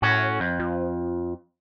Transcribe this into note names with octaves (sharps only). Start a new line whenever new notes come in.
A2 C#4 F#4
F2
F3